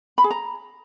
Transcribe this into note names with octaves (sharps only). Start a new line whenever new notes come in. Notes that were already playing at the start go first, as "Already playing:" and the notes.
B5
G#4
A#5